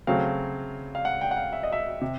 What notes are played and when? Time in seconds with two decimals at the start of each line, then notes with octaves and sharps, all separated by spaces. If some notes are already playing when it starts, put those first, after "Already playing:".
0.07 C#3 F#3 A3 C4 F5
0.95 F5
1.05 F#5
1.21 G5
1.31 F#5
1.37 F5
1.53 E5
1.63 D#5
1.72 E5
2.01 C3